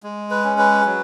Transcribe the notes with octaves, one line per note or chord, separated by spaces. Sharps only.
G#3
B4
C#4
B4
F#3